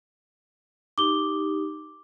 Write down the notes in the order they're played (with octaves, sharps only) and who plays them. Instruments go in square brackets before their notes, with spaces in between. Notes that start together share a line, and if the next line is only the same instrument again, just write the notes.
[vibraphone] D#4 G4 [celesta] D6 G7